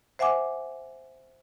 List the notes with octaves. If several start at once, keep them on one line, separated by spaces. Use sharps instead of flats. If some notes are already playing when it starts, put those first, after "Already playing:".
C5 E5 F#5 G#5 D6